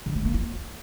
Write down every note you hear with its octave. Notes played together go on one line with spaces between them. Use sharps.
D3
A3
A#3
F4